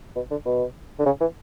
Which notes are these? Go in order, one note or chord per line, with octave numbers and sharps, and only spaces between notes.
B2
D3
B2
D3
C#3
E3